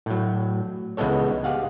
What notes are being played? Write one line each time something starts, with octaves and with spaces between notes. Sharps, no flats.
A2 F#3
C#2 E3 G#3 B3 A4 C#5
G4 G#4 F5 F#5